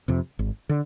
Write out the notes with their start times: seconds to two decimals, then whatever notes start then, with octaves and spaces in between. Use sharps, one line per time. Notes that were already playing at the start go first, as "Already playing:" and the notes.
0.08 F2 C3
0.39 G#1
0.69 D3